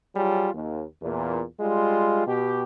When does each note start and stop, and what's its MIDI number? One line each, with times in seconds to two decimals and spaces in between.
0.15 0.49 54
0.15 0.49 55
0.15 0.49 65
0.15 0.49 68
0.54 0.84 39
1.02 1.42 40
1.02 1.42 46
1.61 2.24 55
1.61 2.24 56
1.61 2.24 65
2.27 2.63 47
2.27 2.63 67